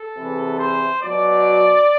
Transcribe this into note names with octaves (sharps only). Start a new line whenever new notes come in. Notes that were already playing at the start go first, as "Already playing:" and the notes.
Already playing: A4
E2 C3 E3
C5
B2 F#3 D5